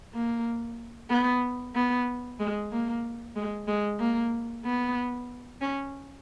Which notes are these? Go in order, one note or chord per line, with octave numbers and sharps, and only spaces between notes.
A#3
B3
B3
G#3
A#3
G#3
G#3
A#3
B3
C#4